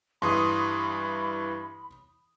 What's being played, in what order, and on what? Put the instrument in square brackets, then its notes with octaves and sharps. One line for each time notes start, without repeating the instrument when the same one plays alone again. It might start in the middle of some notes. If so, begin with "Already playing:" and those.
[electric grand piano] G2 E3 [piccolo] B5 [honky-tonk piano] C6 D#6